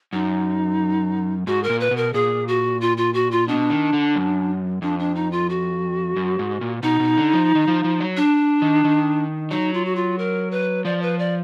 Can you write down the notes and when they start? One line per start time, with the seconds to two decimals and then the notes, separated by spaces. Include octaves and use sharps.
0.13 F#2 D#4
1.47 G#2 F#4
1.63 A#4
1.69 A#2
1.80 B4
1.91 B2
1.97 A#4
2.14 A#2 G#4
2.48 F#4
2.81 F4
2.97 F4
3.14 F#4
3.31 F4
3.48 B2 D4
3.70 D#3
3.93 D3
4.16 F#2
4.82 F2 D4
4.99 D4
5.15 D#4
5.32 F4
5.50 F#4
6.16 F#2
6.39 G#2
6.61 A#2
6.83 B2 D#4
7.00 B2
7.17 D3
7.33 F3
7.55 D#3
7.68 F3
7.84 F3
8.01 F#3
8.17 D4
8.62 D#3
8.84 D#3
9.51 F#3 D#4
9.74 F4
9.85 F#4
9.96 F4
10.19 A#4
10.51 B4
10.85 F3 D5
11.02 B4
11.19 D5